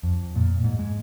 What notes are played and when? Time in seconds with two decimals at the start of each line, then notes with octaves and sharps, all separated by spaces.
0.03 F2
0.36 A#2
0.64 G#2
0.79 G#3